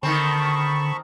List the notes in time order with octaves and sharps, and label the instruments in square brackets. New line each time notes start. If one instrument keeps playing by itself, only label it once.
[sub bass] D3 [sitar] D#3 C4 [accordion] A5 B5 C#6